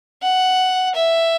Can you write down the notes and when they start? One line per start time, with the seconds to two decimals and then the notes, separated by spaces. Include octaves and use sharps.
0.23 F#5
0.95 E5